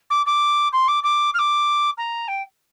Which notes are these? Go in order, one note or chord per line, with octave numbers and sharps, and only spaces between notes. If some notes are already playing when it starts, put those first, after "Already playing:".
D6
D6
C6
D6
D6
F6
D6
A#5
G5